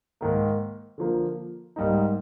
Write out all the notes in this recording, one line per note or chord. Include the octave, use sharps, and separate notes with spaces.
G#2 D#3 A#3
D3 F3 A#3
G#2 G3 A#3 D#4